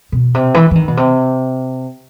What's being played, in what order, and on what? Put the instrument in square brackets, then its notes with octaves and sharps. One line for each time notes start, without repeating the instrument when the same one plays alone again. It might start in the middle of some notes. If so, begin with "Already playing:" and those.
[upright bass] B2
C3
E3
E3
D#3
B2
C3